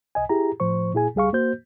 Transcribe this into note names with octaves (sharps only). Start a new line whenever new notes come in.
C2 D#5 G#5
E4 G4 G#4 A#5
A2 F3 C5 C#6
A#2 E4 G#4 G#5
C#2 G3 G#4 F5 C#6
A#3 F#4 C5 G6